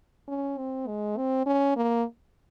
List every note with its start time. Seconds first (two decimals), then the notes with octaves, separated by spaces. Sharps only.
0.28 C#4
0.58 C4
0.87 G#3
1.17 C4
1.46 C#4
1.76 A#3